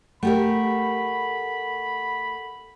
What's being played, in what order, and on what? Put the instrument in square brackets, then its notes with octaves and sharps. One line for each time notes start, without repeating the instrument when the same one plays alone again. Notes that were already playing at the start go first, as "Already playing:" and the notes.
[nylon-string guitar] A3 G4 A#4 [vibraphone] F#5 [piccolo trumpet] B5